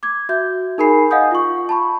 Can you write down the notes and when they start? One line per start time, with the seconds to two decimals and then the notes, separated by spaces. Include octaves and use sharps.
0.03 D6 G#6
0.29 F#4 E5 G6
0.78 D#4 G#4 A#4 G#5 B5 C7
1.11 D#5 F5 F#5 G#5 D#6 G6
1.31 F4 C#6
1.69 A5 B5 C#6